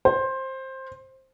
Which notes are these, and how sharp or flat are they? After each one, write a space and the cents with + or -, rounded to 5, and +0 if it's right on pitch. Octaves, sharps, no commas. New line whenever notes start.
C5 +15